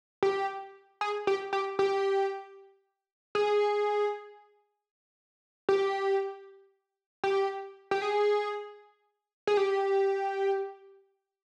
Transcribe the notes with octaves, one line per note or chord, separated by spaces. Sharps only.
G4
G#4
G4
G4
G4
G#4
G4
G4
G4
G#4
G#4
G4